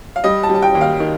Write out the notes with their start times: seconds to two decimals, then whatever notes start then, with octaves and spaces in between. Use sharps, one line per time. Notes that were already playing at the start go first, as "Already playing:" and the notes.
0.16 F5
0.24 G3 D#5
0.43 A5
0.49 G3
0.55 A5
0.62 G5
0.75 D#2
0.81 F5
1.00 D#3